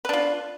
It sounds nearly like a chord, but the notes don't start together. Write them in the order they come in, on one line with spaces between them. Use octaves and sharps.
B4 D4 F4